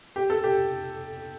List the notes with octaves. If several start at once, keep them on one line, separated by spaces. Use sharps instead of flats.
G4
A4
G4